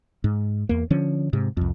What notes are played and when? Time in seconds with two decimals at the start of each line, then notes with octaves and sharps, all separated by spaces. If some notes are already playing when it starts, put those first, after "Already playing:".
0.24 G#2
0.69 E2 A#3
0.90 D3 F3 C#4
1.33 G#2 C3
1.57 C2 F2